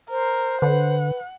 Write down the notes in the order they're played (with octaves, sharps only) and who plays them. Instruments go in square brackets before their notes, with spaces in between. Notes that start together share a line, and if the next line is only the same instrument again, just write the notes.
[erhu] A#4 [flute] C5
[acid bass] D3 [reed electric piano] B4 [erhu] F#5